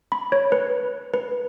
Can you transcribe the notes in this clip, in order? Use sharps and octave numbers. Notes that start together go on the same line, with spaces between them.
B5
C#5
B4
B4